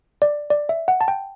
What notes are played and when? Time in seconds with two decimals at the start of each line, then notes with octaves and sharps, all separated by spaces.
0.22 D5
0.50 D5
0.69 E5
0.88 F#5
1.01 A5
1.08 G5